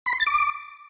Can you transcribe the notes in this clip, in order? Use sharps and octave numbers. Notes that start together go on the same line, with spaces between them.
B5
C6
A6
D6